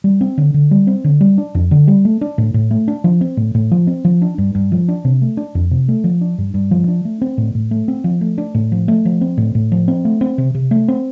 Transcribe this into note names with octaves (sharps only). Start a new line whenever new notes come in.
G3
C4
D3
D3
G3
C4
D3
G3
D4
F2
D3
G3
A3
D4
A2
A2
A3
D4
F3
C4
A2
A2
F3
C4
F3
D4
G2
G2
F3
D4
C3
A3
D4
F2
C3
A3
F3
D4
G2
G2
F3
D4
A3
C4
A2
A2
A3
C4
F3
A3
D4
A2
F3
A3
F3
C4
A2
A2
F3
C4
A3
C4
C3
C3
A3
C4